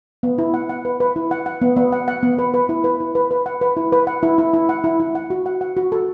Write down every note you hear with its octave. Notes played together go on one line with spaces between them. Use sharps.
B3
E4
F#5
F#5
B4
B4
E4
F#5
F#5
B3
B3
F#5
F#5
B3
B4
B4
E4
B4
E4
B4
B4
F#5
B4
E4
B4
F#5
E4
E4
E4
F#5
E4
E4
F#5
F#4
F#5
F#5
F#4
A4